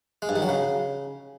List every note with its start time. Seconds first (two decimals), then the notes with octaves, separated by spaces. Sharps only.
0.22 G#3
0.29 G2
0.36 D#3
0.42 F#3
0.49 C#3